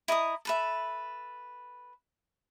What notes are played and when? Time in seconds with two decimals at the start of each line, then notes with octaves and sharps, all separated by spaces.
0.08 E4 D#5 A#5 D#6
0.45 A4 B4 E5